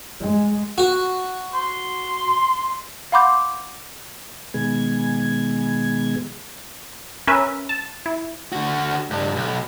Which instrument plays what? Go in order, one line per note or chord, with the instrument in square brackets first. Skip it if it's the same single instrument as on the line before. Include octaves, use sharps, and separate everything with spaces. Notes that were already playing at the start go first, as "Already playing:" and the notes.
[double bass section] G#3
[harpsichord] F#4
[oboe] C6
[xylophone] F5 F#5 B5 C6 D6 G6
[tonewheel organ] B2 D#3 G#3 B3 G#4 G#6
[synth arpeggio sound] C#4 A#4 B4 E5
A5
E4
[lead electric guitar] D3 F#4
C#2 G2
B1